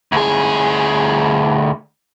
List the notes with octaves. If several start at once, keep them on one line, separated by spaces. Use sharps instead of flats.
D2 G#4